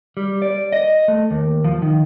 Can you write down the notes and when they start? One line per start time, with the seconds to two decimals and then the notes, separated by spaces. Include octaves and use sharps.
0.17 G3
0.42 D5
0.73 D#5
1.08 A3
1.31 D#2
1.64 F3
1.82 D#3